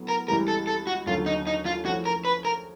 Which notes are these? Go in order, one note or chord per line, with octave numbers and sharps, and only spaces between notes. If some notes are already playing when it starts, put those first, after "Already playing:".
Already playing: A2 F#3 B3
A#4
C#2 C#3 E3 G3 A#4
A4
A4
F#4
D#2 D3 F#3 A3 C#4 F4
D#4
D#4
F4
C#3 F3 A3 C#4 E4 F#4
A#4
B4
A#4